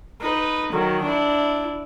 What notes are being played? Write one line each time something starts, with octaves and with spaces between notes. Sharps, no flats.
D#4 B4
D#3 F#3
D4 E4